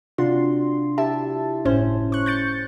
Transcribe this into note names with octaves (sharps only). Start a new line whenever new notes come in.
C3 D4 F4 F#4 C6
E4 G4 E5 A5
G1 A2 C#4 C5
C#6 F#6
G6 A6 C#7